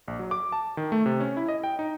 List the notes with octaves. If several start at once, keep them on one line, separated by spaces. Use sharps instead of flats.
A#1
F#3
D6
A5
D#3
A3
C3
C#4
E4
D#5
G5
D#4